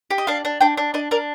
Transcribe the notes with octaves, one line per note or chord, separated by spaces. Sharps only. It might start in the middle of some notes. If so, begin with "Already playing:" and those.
G4
D#5
D4 F5
D4
D4 G5
D4
D4 D#5
D4 A#4